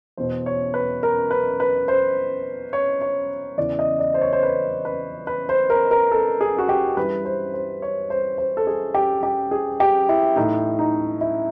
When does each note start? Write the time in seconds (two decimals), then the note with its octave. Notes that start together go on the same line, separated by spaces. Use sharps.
0.17 E2 B2 C5
0.46 C#5
0.74 B4
1.03 A#4
1.31 B4
1.60 B4
1.88 C5
2.73 C#5
3.01 C#5
3.57 E2 C#3 E3 D5
3.79 D#5
3.99 D5
4.14 C5
4.22 C#5
4.33 C5
4.43 B4
4.85 B4
5.27 B4
5.49 C5
5.70 A#4
5.91 A#4
6.11 A4
6.41 G#4
6.58 F#4
6.69 G4
6.97 G2 E3 B4
7.25 C5
7.54 C5
7.82 C#5
8.10 C5
8.38 C5
8.57 A4
8.67 G#4
8.94 G4
9.23 G4
9.51 G#4
9.80 G4
10.09 E4
10.36 A2 E3 D#4
10.79 D#4
11.21 E4